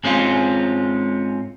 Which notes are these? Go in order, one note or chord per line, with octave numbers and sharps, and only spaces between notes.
G#2 G#3 C4 C#4 F4